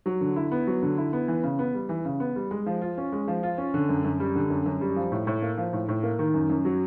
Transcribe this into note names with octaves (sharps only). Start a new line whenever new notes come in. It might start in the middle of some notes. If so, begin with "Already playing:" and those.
F#3
D3
E4
B3
F#3
D3
E4
B3
E3
C#3
B3
G3
E3
C#3
B3
G3
G#3
F3
F4
C#4
G#3
F3
F4
C#4
D3
F#2
F#2
G3
D3
F#2
F#2
G3
F3
A2
A2
A#3
F3
A2
A2
A#3
D#3
F#2
F#2
F#3